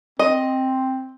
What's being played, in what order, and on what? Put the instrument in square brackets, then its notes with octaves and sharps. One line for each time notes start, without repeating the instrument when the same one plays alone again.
[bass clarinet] C4 [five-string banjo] D#5